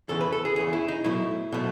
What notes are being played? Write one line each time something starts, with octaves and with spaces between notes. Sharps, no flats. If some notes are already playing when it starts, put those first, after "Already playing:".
E2 C#3 E3 A4
B4
A4
G#4
E2 C#3 E3 G#4
E4
D#4
B2 F#3 A3 E4
B2 F#3 A3